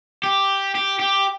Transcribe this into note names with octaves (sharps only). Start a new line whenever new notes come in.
G4
G4
G4